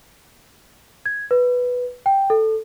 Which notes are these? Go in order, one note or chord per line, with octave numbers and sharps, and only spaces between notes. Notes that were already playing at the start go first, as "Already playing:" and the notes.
G#6
B4
G5
A4